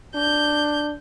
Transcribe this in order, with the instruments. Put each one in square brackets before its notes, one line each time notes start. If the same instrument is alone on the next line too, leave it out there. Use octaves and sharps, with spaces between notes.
[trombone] D4 [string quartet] G6